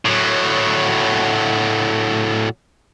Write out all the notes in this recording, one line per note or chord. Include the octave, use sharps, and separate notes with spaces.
A2 F#3